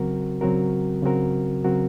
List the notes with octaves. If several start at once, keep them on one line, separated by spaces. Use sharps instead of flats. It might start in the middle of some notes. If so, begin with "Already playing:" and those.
Already playing: C#3 F#3 C4 F#4 A#4
C#3 F#3 C4 F#4 A#4
C#3 F#3 C4 F#4 A#4
C#3 F#3 C4 F#4 A#4